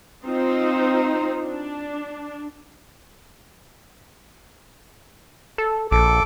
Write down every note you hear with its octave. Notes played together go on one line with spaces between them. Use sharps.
C4 D#4 F4 C5
D4
A4
A#1 A4 D6